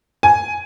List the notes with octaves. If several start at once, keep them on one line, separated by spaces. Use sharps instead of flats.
G#5